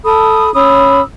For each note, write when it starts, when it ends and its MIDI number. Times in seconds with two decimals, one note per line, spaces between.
0.04 0.52 69
0.04 0.52 83
0.04 0.52 87
0.54 1.01 61
0.54 1.01 83
0.54 1.01 87
0.54 1.01 88